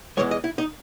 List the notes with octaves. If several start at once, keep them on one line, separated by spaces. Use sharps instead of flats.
E2 C#3 E3 G#3 C#5
D#5
E4
D#4